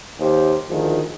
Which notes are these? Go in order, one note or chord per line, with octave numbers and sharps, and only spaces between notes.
D#2 D#4 G4 C5
D2 D#3 F3 G#4